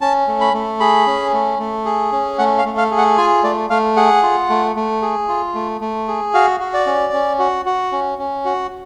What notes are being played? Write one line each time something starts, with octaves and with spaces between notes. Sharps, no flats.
C#4 A5
A3
B5
A3
G#4 B5
C#4
A3
A3
G#4
C#4
A3 F#5
F5
A3
F5
G#4
F#5
F4 G#5
A3 D5
A3 F5
G#4 F#5
F4
A3
A3
G#4
F4
A3
A3
G#4
F#4 F5
F#4
D5
C#4
C#4
F#4
F#4
C#4
C#4
F#4